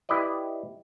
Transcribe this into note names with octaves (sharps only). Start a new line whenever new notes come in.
E4 G4 B4 D5 D#5